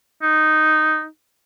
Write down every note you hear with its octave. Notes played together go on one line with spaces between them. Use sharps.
D#4